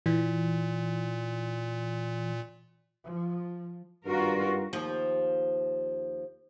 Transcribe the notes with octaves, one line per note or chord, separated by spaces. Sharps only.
A#2 E3
F3
G#1 G2 F4 F#4 A#4
D#2 F3